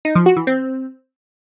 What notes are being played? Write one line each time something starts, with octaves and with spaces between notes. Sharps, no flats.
D#4
F3
F#4
E3
C4